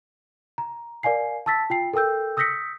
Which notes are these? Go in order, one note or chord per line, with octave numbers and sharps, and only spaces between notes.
A#5
A#4 D5 F5 G#5 C7
A5 C#6 E6 A6 B6
F4 G5 C7
A4 A#4 G5 E6 G6
D#6 E6 G6 A#6 B6 C#7